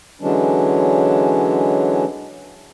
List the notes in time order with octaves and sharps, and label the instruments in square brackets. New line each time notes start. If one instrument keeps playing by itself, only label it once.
[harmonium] D3 E3 F#3 G#3 C#4 D4